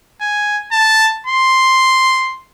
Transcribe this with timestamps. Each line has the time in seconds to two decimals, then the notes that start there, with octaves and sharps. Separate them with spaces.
0.21 G#5
0.72 A5
1.27 C6